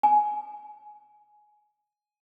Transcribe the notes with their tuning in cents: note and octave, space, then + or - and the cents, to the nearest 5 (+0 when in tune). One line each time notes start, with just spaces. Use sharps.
G#5 +15